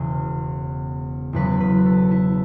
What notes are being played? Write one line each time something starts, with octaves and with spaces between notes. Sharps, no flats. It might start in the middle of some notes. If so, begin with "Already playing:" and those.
Already playing: E1 E2 C#3
E1 E2 C#3 F#3 B4
B4
A4
E4